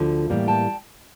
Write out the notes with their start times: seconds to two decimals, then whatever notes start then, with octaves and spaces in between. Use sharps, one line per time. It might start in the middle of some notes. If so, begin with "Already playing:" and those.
Already playing: D2 D3 F3
0.30 A2 E3 G3 A#3
0.48 G5 A5